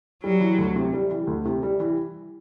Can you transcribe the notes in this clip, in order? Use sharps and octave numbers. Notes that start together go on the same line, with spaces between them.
F#3 G3
E3
D2
C3
G3
E3
D2
C3
G3
E3